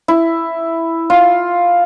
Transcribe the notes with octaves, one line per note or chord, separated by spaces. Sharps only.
E4
F4